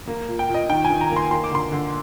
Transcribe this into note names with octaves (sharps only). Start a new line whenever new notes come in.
A#3
A#2
G5
A#2
D#5
D#3 G5
G#5
D#3
A#5
A#3
C6
A#3 C6
D6
D3 C6
D3